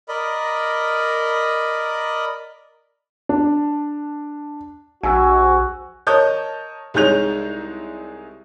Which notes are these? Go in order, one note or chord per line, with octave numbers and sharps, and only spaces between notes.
A#4 D5 D#5 B5
D4
A#1 F#4 G#5 E6
A#4 C#5 D#5 A5 D#6 G6
C2 G#3 D#4 C#5 G6 F7